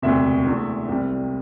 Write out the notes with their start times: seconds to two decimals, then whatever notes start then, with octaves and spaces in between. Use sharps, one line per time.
0.02 E1 D2 C3 E5
0.45 E2 D3 A3
0.89 C2 C3 G3